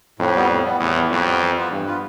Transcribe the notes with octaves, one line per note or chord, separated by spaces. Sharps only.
F2 A2
G3 B3
A2
G3 B3
E2 A2
G3 B3
F2 A2
G3 B3
E3
B3 F4 B4
G2 E3
B3 F4 B4